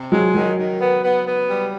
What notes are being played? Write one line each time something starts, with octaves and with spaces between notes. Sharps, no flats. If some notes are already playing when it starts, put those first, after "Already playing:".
Already playing: C3
F#3 G#3
D#3 F#3
D#3
B3
B3
B3
G3